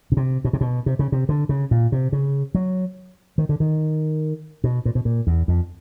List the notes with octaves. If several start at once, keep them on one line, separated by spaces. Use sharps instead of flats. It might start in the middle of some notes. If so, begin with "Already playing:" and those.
C#3
C3
B2
C3
B2
C3
C#3
C3
D3
C#3
A#2
C3
C#3
F#3
D#3
D3
D#3
B2
A#2
B2
A#2
E2
F2